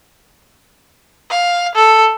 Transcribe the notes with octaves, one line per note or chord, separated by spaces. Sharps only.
F5
A4